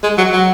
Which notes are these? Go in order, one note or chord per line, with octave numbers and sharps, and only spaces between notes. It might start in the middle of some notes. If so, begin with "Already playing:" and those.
G#3
F#3
F#3